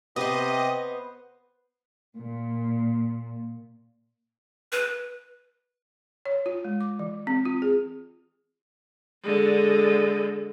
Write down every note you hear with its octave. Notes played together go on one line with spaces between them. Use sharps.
C3 B3 G4 C5 D#5
A#2
B4
C#5
F4
G#3
D6
E3
C4
F4
G#4
D3 G#3